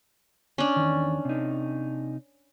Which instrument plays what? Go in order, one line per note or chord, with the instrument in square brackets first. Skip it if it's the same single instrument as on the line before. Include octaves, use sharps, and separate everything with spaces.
[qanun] C#4 D4
[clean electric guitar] E2 D#3
C3 D#4